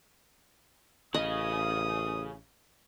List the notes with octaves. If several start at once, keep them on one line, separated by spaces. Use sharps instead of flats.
A1 C#3 D#5 D#6